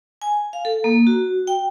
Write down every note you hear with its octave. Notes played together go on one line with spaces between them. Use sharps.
G#5
F5
A4
A#3
F#4
G5